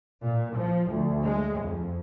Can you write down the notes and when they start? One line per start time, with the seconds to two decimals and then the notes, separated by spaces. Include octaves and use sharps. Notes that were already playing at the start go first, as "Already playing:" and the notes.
0.22 A#2
0.57 F3
0.91 D2
1.25 G#3
1.62 F2